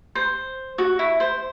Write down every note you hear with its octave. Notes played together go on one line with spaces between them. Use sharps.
C5
F#4
E4
C5